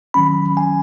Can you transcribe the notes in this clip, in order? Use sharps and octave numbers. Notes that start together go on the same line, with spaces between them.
D#3 F#3 C#4 B5
G#5